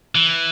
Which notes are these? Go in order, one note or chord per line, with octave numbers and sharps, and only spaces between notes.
E3